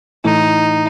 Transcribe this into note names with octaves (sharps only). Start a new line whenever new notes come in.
A2 E3 A3 D#4 E4